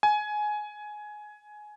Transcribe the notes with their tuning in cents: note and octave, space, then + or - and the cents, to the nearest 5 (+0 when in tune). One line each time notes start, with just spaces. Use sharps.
G#5 +15